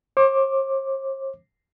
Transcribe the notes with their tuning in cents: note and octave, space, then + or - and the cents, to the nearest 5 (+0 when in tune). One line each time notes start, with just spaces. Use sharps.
C5 +45 D6 +0